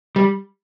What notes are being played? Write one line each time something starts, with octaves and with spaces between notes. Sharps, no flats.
G3